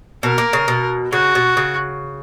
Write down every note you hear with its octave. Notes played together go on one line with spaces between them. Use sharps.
B2 A#4
A#3
C#3
B2
C#3 F#4
B2
C#3